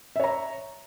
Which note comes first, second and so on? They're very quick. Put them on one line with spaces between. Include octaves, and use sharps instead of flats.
E5 C#5 A#5